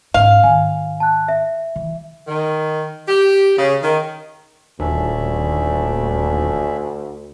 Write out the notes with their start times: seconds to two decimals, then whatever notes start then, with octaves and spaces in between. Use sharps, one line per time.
0.14 G#2 C#4 F5
0.44 G#2 D#3 G#5
1.00 A5 F#6
1.28 E5
1.76 E3
2.27 D#3
3.07 G4
3.57 C#3
3.82 D#3
4.80 D#1 D2 C#4 D4 E5